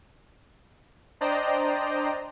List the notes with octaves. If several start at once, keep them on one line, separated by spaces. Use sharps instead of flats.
D4 C5 D5 D#5 G5 A#5